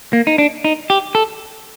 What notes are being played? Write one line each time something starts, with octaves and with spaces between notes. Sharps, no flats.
A#3
D#4
D4
D#4
G4
A4